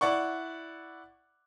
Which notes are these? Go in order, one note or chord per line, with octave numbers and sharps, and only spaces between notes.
E4 D5 F#5 C#6